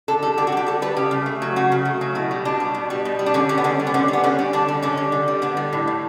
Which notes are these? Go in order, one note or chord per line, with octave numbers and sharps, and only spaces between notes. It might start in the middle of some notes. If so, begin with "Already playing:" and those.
D3 A4
G3 A4
D3 G4
F#4
G3 G4
D3 A4
G3 B4
C#3 G4
C#3
A3
F#3
C#3 F#4
C#3
A3
F#3
B2 E4
G3
B2 D4
G3
B2
G3
B2
G3
D4
D3 C#4
G3 C#4
B3
D3 C#4
G3
B3
D3 C#4
G3
B3
D3 C#4
G3
D3 D4
G3
D3 C#4
G3
D3
G3
D3 B3
G3
A2
A2